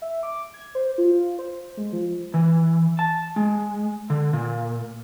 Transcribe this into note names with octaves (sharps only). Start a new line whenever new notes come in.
E5
D6
G#6
C5
F4
C5
G#3
F3
E3
A5
G#3
D3
A#2